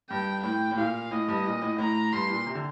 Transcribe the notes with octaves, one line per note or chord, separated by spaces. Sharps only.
G2 G5
A2 G5
A2
A#2 F5
A2 D#5
G2
A#2
A2
A2 A#5
G2 C6
A#2
C3
D3